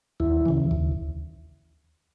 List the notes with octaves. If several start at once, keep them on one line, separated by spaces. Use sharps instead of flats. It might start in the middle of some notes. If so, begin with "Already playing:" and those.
D#2 E4
C#3 E3
D#2